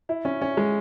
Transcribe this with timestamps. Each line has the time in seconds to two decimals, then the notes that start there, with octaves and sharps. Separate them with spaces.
0.09 E4
0.25 C#4
0.41 C#4
0.57 G#3